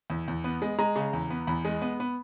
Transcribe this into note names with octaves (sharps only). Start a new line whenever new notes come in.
E2
E2
B3
G#3
G#3 A#5
C#3
E2
B3
E2 B5
G#3
B3
B3